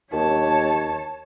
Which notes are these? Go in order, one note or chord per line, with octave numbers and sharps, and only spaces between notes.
D#2 C#5 A5